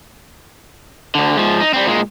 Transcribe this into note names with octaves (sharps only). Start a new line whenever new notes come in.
D2 D3
G#2 F3
D#4
G3 C4
A#2 G#3